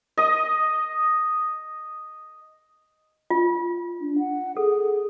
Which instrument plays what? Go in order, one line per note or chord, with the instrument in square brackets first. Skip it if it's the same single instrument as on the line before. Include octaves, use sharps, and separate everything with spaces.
[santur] D#5 D#6
[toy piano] F4
[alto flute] D4
F#5
[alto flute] G#4 [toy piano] A4